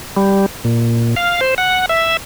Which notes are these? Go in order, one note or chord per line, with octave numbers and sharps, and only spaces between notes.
G3
A#2
F5
C5
F#5
E5